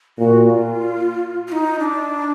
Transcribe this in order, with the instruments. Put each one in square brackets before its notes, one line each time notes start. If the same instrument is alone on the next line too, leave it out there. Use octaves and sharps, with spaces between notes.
[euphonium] A#2 [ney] F#4
[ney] F4
F4
D#4
D4